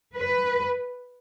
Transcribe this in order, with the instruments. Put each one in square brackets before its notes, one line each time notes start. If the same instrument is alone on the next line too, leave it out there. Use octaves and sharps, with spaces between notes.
[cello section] B4